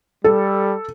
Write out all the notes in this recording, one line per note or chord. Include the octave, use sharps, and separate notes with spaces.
G3 A4